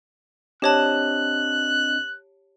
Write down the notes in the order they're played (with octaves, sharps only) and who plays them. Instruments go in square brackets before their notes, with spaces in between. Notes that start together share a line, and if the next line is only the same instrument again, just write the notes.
[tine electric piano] C4 D4 D#5 [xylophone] G4 C#5 A5 [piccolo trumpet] F#6